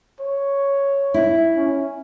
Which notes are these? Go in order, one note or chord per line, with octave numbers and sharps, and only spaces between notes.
C#5
E4
C#4